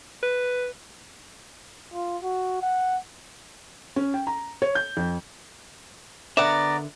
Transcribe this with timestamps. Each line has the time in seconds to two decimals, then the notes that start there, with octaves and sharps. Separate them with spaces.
0.23 B4
1.93 F4
2.23 F#4
2.62 F#5
3.96 C#4
4.14 G5
4.27 A#5
4.62 C#5
4.75 G6
4.97 F2
6.37 D3 B3 A#4 D5 E5 F#5 A#5